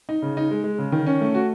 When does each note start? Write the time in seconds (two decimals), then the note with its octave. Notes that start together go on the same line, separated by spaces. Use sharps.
0.09 D#4
0.22 C#3
0.37 D#4
0.51 G#3
0.64 G#3
0.78 C#3
0.92 D#3
1.06 C#4
1.21 A3
1.35 F#4